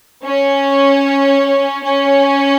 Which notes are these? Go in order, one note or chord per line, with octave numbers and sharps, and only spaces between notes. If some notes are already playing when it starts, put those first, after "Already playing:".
C#4
C#4